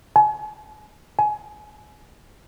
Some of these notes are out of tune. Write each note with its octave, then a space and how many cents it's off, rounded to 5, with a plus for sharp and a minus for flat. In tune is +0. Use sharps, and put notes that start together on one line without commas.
G#5 +40
G#5 +25